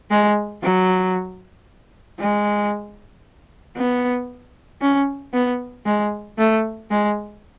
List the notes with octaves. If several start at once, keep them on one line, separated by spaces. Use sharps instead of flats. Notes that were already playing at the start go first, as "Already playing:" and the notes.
G#3
F#3
G#3
B3
C#4
B3
G#3
A3
G#3